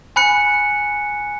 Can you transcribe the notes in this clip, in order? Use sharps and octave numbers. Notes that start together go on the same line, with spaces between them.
G#5 B5 F#6 C#7